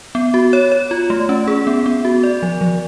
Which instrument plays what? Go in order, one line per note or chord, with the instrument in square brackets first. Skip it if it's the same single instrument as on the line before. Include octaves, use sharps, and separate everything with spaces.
[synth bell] B3
F#4
C#5
C#5
F4
A3
C#4
G#4
B3
B3
F#4
D5
F3
F3